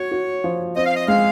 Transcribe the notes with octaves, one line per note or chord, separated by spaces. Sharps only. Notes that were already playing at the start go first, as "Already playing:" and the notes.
Already playing: F#4 C#5
F#4
F3
C4 D#5
F5
D#5
G#3 F5